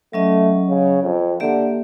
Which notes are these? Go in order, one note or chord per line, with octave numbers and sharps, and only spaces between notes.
F#3 A3 C#4 D#5
C#3
F2
D3 A#3 G4 E5